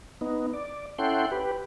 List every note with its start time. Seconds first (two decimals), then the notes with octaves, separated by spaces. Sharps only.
0.21 B3 D#4
0.54 D5
0.98 C#4 E4 A4 F#5 G5 C6
1.32 G4 B4